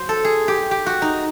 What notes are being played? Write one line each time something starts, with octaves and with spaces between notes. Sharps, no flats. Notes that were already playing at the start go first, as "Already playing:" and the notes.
Already playing: F#3 C5
A4
G#4
G4
G4
F#4
D#4